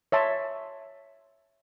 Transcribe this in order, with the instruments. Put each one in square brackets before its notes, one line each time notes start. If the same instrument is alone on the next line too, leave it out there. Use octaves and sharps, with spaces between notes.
[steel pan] C#5 E5 A5 C6